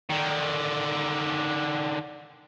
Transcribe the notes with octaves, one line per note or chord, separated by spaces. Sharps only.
D3 D#3